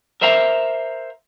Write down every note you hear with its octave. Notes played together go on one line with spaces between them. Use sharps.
A#4 C5 E5 F5 A#5